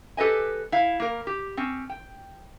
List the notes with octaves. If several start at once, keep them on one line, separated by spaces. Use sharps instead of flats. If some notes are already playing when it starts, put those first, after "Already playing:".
G4 A4 B4 D#5 G#5
E4 F5
A#3 A#4
G4
C4 C#4
G5